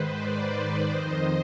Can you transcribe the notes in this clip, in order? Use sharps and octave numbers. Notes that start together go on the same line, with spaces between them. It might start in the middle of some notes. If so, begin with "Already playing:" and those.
Already playing: G#2 D#3 B4 C5
B4 D5
F2 D#3 C5 D#5